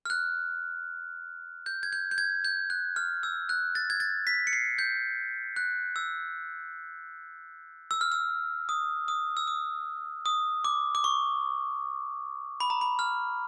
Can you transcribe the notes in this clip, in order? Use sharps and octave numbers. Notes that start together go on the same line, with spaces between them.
F6
F#6
G6
G#6
G6
G6
G#6
G6
F#6
F6
E6
F#6
A6
G#6
A6
B6
C#7
C7
G6
F#6
E6
E6
F6
E6
D#6
D#6
E6
D#6
D#6
D6
D6
C#6
B5
A#5
B5
F6